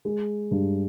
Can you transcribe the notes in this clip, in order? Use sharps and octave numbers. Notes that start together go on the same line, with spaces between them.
G#3
G2